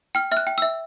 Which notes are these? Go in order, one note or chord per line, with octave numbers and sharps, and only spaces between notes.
G5 F6
E5 F6
F#6
G5
E5 E6